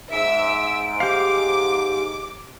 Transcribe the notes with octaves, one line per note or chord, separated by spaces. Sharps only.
G#2 E5 E6 D7
G4 F5 D6